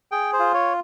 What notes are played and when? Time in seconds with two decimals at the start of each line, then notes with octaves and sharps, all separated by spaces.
0.12 G#4 G5
0.33 C5
0.39 F4
0.54 C#5